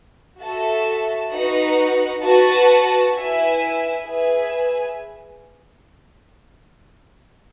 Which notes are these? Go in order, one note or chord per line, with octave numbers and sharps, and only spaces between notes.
F#4 A4 E5 A5
D#4 F#4 B4 F#5
F#4 B4 F#5 A5
E4 B4 E5 G#5
G#4 B4 E5 G#5